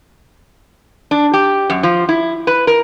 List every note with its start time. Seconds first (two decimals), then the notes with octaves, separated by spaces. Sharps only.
1.11 D4
1.33 G4
1.70 F#2
1.83 F3
2.09 E4
2.47 B4
2.67 A#4